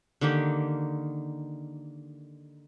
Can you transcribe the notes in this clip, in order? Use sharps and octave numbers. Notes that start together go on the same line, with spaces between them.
D3 D#3 A#3 G4